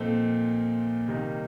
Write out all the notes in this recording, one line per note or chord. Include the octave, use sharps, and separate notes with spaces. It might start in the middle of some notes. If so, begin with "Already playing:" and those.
Already playing: A#2 F3 C4 D#4 A4
C3 D#3 G3 A#3 D#4